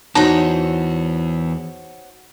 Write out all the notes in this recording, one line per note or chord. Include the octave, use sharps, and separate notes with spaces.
E2 D#4 F#4 C5 C#5 A5